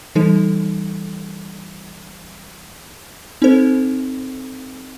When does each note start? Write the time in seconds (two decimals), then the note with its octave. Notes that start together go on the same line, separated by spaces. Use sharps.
0.15 E3 G3 D#4 A4
3.42 C4 D#4 A4 C5